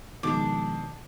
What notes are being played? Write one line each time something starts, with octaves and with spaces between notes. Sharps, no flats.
B2 D#3 F3 G#3 D4 D6